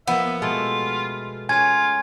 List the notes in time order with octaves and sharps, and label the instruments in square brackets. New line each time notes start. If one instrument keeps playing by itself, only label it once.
[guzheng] F3 A#3 [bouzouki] B3 [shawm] E5
[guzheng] B2 G#3 A3 [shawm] F4
[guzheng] C#4 C#5 [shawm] F4 [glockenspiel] G#5 G#6